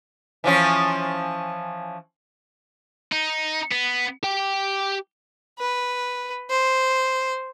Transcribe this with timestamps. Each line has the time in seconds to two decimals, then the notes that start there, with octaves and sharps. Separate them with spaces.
0.44 E3 F3 C#4
3.12 D#4
3.71 B3
4.23 G4 G5
5.59 B4
6.50 C5